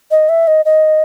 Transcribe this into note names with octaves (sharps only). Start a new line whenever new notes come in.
D#5
E5
D#5
D#5